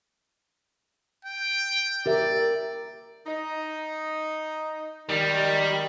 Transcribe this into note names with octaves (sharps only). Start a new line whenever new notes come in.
G5
G4 A#4 D5 E5
D#4
D#3 G3